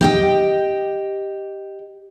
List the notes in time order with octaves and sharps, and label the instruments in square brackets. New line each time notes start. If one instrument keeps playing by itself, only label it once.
[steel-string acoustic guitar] G4 D#5 G5